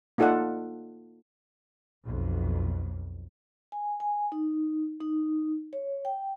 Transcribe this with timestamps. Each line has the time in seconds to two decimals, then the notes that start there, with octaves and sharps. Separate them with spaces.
0.18 A#3 D#4 F4 A4 D5 F#5
2.05 B1 F2
3.72 G#5
4.00 G#5
4.32 D#4
5.01 D#4
5.73 C#5
6.05 G5